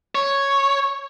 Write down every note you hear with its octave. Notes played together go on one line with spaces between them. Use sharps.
C#5